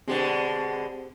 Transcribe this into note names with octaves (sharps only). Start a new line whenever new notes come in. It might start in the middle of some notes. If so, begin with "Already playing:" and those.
B2 D3 G#3 C4 G4 C5